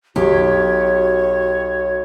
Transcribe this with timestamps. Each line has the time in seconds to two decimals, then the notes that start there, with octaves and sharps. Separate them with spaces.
0.16 B1 F#4 G4 C#5